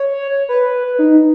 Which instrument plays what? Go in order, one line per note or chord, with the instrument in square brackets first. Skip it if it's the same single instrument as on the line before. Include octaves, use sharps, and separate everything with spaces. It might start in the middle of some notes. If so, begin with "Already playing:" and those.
Already playing: [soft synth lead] C#5
B4
D#4